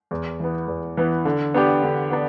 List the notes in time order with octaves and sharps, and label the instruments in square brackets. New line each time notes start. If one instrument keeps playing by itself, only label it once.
[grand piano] E2
E3 B3
E2
E3 B3
D3
B3 D4 G4
D3
B3 D4